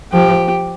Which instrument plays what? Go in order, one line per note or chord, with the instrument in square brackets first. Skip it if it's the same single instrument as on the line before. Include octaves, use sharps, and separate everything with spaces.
[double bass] F3 [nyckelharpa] G4